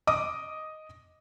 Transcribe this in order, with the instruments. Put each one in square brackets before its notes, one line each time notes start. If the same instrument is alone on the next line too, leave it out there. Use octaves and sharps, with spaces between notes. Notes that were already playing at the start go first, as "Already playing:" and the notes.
[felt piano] D#5 D6 D#6